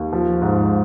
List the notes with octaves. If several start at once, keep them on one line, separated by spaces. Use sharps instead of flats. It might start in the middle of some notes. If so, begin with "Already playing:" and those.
Already playing: D#2
F3
G#2